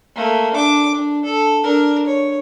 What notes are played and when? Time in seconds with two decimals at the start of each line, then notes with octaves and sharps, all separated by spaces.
0.15 A3 A#3
0.54 D4 D6
0.94 D4
1.25 A4
1.63 D4 A#4
2.06 C#5